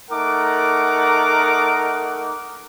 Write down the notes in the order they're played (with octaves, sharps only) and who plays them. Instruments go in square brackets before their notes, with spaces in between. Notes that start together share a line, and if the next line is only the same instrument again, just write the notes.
[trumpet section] A3 D#4 A#4 F#5 D6